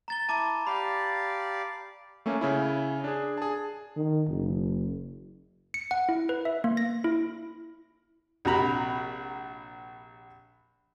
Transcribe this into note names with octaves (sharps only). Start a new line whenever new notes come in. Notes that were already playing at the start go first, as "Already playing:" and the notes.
A#5 A6 G7
E4 A5 A#5 D6
G4 D5 F5 B5
A3 A#3 C#4
C#3 C#4 E4
D4 G#4
G#4 A5
D#3
F#1
C#7
F#5
E4
B4
E5
A#3
A#6
E4
A#1 C3 F#4 A#5 B5